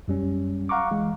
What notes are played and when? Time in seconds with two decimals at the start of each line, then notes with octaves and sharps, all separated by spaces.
0.08 F#2 G3 C#4
0.69 F5 F#5 A#5 C#6 D6
0.91 E3 G#3